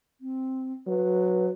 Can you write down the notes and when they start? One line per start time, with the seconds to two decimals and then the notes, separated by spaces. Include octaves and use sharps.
0.21 C4
0.87 F#3 B4